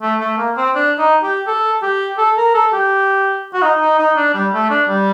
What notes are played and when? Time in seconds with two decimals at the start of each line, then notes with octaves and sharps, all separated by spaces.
0.02 A3
0.20 A3
0.38 A#3
0.57 C4
0.75 D4
0.99 D#4
1.23 G4
1.47 A4
1.82 G4
2.18 A4
2.37 A#4
2.54 A4
2.73 G4
3.54 F#4
3.62 D#4
3.81 D#4
3.99 D#4
4.17 D4
4.34 G3
4.53 A3
4.70 D4
4.88 G3